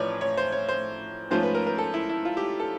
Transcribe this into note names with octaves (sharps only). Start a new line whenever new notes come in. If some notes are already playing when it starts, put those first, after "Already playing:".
Already playing: A1 A2 F3 B4 C#5 D5
C#5
C5
C#5
C5
G#2 F3 A3 C#4 C5
B4
A#4
A#4
A4
E4
E4
F4
G4
A4